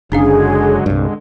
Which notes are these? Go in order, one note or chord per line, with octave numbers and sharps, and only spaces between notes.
F#1 D3 F#3 G#3 C#4 D4 G#4 F5
C2 G2 D3 G#3